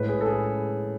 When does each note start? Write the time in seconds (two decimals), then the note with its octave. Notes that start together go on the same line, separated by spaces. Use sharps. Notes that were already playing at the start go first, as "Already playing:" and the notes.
Already playing: A2 G#3 B4
0.09 G#4
0.21 A4
0.26 G#4